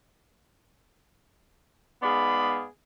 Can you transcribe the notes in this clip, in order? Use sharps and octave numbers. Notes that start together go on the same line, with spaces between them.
G#2 B3 G#4 D5 F5 B5